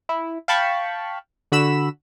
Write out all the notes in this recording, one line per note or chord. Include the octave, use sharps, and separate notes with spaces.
E4
F5 G5 A5 B5 C#6
D3 F#4 B5 E6 E7